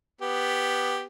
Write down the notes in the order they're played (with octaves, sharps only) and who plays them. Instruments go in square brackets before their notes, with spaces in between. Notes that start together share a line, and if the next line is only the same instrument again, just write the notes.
[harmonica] B3 G4